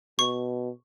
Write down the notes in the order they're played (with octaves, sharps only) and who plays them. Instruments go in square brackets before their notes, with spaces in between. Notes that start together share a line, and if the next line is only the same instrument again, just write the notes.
[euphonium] B2 [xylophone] C#6